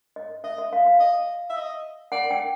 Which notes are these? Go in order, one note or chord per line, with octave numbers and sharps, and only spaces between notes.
D#5
D#5 E5
E5
F5
F5
D#5
E5
D#5
D5 F#5
G5